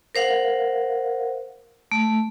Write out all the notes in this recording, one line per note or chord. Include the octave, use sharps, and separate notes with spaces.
A#4 C5 F5 F#5
A3